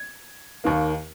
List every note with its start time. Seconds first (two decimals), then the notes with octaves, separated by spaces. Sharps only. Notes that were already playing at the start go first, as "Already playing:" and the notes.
Already playing: G#6
0.64 D#2 D#3 A#3